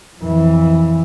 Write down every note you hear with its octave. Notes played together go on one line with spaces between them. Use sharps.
F2 E3